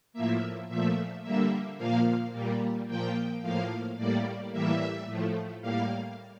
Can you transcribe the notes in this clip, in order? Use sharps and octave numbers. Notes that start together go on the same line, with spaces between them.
A2 F3 A#3 E5
A#2 F3 A3 E5
D3 G3 A#3 E5
A#2 F3 A#3 F5
A#2 G3 A#3
A#2 F3 A#3 G5
A2 F3 A#3 F5
A2 G3 A#3 D5
A2 E3 G3 A#3 E5
A2 F3 A3
A2 G3 A#3 F5